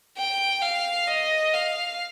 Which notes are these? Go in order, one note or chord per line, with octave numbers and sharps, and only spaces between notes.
G5
F5
D#5
F5